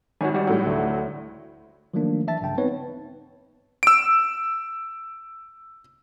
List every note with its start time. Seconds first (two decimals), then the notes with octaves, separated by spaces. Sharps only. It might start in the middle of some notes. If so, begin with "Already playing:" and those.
0.21 G#1 F#4 C#5 G#5
0.34 G3 F#4
0.47 A2 F#3
0.66 D2
1.94 D#3 F3 F#3 A3 A#3 D4
2.27 E3 E5 A5 A6
2.41 A#1 G2 C#3 G5 A5
2.58 B3 C4 D#4 B4 C#5
3.83 E6 D7